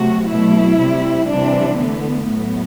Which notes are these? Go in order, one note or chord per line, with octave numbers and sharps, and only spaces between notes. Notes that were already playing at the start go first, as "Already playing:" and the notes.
Already playing: C3 F#3 A3 F#4
B2 F#3 A3 E4
C3 G3
C3 E3 G3 D4
D3 A3 B3
A2 F#3 A3 B3